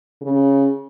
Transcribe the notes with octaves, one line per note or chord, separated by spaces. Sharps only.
C#3